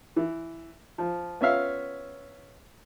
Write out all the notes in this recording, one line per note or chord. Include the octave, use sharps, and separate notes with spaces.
E3
F3
B3 C#4 F4 E5 F5